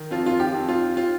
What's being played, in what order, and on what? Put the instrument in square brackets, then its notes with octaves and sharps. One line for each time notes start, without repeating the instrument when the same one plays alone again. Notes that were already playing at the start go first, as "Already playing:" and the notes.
Already playing: [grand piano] D#3
F2 F4
F4
G4
F2
F4
F4